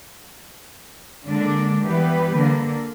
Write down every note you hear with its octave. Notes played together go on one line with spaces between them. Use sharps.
D3 G#3 A#3 D4
E3 G3 B3 G4 B4
D3 A#3